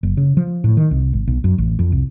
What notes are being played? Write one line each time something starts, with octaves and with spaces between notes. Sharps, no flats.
F#1
C#3
F3
A2
D#3
C2
G#1
B1
F#2
A1
F2
C2